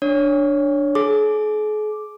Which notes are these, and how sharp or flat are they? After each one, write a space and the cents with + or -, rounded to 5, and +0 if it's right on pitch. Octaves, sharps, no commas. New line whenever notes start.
D4 +0 C#5 +0
G#4 +40 D6 +0